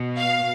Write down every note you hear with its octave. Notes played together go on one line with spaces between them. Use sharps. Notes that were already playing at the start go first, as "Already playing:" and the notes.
Already playing: B2
F5